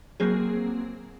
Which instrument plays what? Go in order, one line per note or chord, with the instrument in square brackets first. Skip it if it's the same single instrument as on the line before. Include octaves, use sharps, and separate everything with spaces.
[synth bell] F#3 A#3 C4 G#4